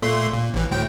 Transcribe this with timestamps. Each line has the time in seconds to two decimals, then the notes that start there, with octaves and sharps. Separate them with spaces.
0.02 A#2 A3 C6
0.34 A#2
0.54 A1 E3
0.71 D2 A2 G5